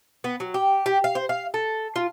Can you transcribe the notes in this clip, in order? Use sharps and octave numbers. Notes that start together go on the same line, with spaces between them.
B3
F#3
G4
G4
F5
C5
F5
A4
F4